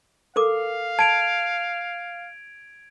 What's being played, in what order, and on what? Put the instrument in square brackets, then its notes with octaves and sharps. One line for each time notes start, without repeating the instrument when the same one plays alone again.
[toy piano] A4 A#4 D6 [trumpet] F5
[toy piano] A5 [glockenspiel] G#6 D7 F7